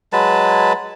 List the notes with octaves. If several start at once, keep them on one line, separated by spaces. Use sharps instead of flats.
F#3 G#3 B4 A5